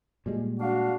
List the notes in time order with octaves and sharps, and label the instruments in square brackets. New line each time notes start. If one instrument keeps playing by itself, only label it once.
[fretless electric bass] A#2 G3 G#3
[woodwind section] D4 F5 [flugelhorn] F#4